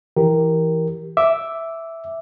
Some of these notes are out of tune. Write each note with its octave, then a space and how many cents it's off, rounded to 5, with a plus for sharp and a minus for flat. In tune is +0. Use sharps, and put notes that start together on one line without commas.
E3 +0 G4 +0 A#4 +0
E5 +0 D6 -5